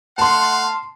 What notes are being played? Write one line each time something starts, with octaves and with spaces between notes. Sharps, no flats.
A3 F5 F#5 A5 C6